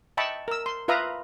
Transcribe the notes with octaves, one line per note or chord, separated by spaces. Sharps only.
D#5 E5 G5 A5 B5 C#6
A#4 E6
C6
F4 B4 E5 F5 A#5 D#6